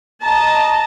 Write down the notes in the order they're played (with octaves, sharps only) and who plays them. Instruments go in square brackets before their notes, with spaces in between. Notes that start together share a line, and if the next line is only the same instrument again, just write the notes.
[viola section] D#5 A5 [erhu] A#5